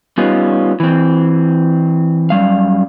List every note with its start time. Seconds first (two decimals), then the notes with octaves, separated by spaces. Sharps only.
0.18 G3 B3 C#4 D#4 F4
0.80 E3 C4
2.30 F#2 G3 F5